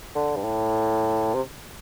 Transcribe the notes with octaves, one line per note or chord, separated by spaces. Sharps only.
D3
G2
A2
C3